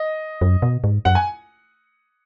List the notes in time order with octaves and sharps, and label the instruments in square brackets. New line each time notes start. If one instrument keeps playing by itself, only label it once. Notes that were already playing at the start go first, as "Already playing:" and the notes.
Already playing: [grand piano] D#5
[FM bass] F#2
B2
G#2
[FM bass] F#2 [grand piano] F#5
[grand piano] G#5